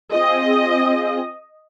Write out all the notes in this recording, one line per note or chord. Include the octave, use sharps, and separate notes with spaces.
C4 F4 G#4 D#5